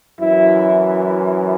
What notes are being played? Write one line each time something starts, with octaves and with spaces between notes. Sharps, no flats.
F#2 E3 E4